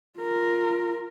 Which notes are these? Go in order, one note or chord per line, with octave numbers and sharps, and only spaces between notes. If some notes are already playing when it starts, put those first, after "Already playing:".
F4 A#4